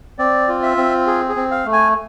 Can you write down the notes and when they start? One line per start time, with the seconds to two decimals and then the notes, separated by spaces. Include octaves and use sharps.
0.19 C4 D5
0.48 F4
0.63 E5
0.77 C4
1.07 G#4
1.29 G#4
1.36 C4
1.51 F5
1.65 A3
1.73 G#5